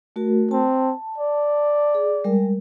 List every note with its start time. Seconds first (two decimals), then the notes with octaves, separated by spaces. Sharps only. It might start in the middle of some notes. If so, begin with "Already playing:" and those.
0.16 A3 F#4 A#4
0.51 C4 A5
1.18 D5
1.95 G#4
2.24 G3 G#3 A#4